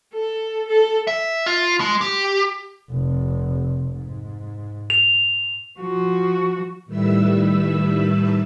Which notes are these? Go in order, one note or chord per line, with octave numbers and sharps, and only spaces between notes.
A4
A4
E5
F4
G#3
G4
F1 C3
G#2
F7
F3 F#4
A2 D#3 G3 B4 E5 E6